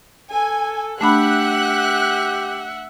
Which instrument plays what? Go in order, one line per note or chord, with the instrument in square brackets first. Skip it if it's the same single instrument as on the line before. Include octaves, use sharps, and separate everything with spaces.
[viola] A4 [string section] G#5
[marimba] A3 D4 B5 [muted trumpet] G4 [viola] E5 F#5 [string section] F#6